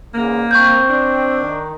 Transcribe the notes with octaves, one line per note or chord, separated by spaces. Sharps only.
E2 G#2 C#3 A#3
C4 C#6 G6
D4
D#3